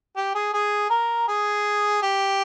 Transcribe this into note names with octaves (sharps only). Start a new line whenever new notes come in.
G4
G#4
G#4
A#4
G#4
G4